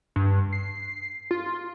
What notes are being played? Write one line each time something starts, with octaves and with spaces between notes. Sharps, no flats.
G2
C7
F4